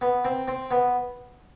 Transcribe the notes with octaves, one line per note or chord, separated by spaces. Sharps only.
B3
C4
C4
B3